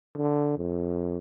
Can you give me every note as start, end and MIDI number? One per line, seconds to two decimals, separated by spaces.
0.16 0.54 50
0.57 1.18 41